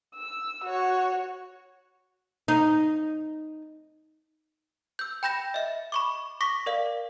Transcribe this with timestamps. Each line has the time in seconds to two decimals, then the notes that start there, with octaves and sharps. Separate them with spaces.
0.15 E6
0.64 F#4 C#5
2.48 D#4
4.99 E6 G6
5.23 G5 B5 G6 A#6 E7
5.54 D#5 E5
5.92 B5 C#6 D6
6.41 C#6 D6 A#6 B6
6.66 A#4 D5 F5